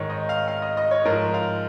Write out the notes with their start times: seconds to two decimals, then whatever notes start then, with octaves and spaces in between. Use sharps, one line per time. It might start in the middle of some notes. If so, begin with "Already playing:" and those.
Already playing: G#2 D#3 C#5
0.10 D#5
0.29 F5
0.48 F5
0.62 D#5
0.77 D#5
0.91 C#5
1.05 G#2 F3 A#4
1.34 F5